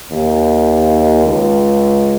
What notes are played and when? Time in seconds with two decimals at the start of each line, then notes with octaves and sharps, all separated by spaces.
0.10 D#2
1.26 C#2